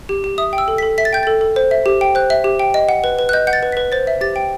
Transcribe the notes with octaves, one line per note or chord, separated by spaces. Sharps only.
G4
G4
E5 D#6
G5
E6
A4
B6
A4
E5 B6
A6
G5 G6
A4 A6
A4
C5
E5
G4
G5
C5 F#6
E5
G4
G5
D#5
F#5
B4
B4
F#6
D#5 G6
F#5 G6
A6
B4
B6
B4
C5 A6
E5
G4 A6
G5